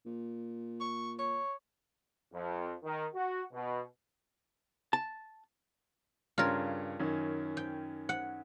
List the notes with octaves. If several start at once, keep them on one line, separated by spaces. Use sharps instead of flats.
A#2
C#6
C#5 C#6
F2
D#3
F#4
B2
A5
G2 C#3 F4 A#4 C#5
F#2 D#3 C#4
G5
F#5